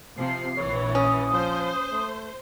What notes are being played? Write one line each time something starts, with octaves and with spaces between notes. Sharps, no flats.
C3 F3 C7
A#1 E3 C#5
C#4 D#6
F3 C5
A3